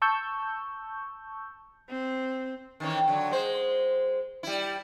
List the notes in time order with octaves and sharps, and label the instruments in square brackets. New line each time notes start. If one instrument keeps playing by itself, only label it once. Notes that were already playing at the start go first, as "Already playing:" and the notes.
[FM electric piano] A5 C#6 E6 G6
[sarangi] C4
[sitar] D#3 E3 C#4
D3 F#3
G#3 C5
G3 E4